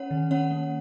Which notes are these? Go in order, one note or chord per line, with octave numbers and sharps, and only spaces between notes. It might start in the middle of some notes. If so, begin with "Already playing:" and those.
Already playing: C#4 C#5 F#5
D#3
C#4 C#5 F#5
A#3